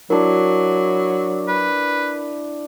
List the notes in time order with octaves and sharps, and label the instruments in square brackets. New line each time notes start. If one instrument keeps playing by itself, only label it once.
[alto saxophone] F#3 [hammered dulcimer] D4 E4 [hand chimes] A#4
[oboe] B4